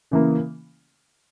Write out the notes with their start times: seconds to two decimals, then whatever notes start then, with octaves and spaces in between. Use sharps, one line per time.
0.11 C#3 E3 A#3